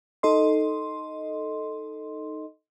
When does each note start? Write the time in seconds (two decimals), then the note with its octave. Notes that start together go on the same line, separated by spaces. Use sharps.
0.23 D#4 A4 D#5 C6